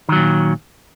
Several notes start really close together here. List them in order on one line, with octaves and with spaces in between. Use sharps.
D#3 F#3 A#2